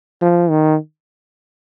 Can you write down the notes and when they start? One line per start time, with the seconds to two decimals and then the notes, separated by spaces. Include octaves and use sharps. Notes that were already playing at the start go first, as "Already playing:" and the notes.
0.22 F3
0.50 D#3